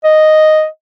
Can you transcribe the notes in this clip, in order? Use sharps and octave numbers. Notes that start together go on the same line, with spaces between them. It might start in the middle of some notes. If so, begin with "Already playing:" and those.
D#5